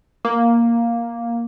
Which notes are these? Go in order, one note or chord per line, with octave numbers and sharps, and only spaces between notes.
A#3